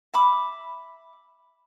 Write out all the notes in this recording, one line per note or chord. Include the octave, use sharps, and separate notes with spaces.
E5 B5 D6